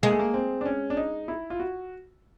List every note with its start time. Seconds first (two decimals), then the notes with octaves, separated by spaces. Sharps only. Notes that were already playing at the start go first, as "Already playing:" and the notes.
0.03 G#3 A#3
0.11 A3
0.19 A#3
0.34 C4
0.61 D4
0.65 C#4
0.90 D4
0.97 D#4
1.28 E4
1.50 F4
1.59 F#4